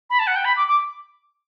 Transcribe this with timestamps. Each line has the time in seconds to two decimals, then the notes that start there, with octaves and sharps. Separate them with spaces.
0.10 B5
0.19 A5
0.27 F#5
0.36 G5
0.45 B5
0.56 D6
0.67 D6